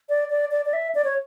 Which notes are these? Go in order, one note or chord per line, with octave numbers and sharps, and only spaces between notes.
D5
D5
D5
D5
E5
D5
C#5